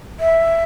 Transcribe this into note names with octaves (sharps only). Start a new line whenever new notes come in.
E5